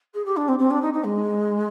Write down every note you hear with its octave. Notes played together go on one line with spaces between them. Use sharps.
G#4
G4
D4
C4
C4
D4
D#4
D#4
G#3